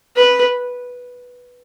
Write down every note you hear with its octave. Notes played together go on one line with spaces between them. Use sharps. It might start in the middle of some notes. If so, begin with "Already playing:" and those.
B4